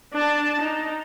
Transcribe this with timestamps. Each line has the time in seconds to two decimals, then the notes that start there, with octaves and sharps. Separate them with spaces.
0.13 D4 A5
0.61 D#4